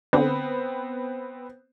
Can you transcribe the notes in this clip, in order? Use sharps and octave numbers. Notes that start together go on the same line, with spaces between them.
D3 B3 C4